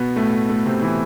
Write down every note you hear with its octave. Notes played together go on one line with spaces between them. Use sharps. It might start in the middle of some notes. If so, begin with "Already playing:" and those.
Already playing: B2 B3
A2 A3
A2 A3
C3 C4
E3 E4